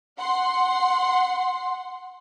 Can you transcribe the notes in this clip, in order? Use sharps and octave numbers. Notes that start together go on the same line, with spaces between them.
F#5 C6